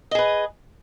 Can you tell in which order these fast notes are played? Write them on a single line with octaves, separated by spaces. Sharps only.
D#5 G#4 B4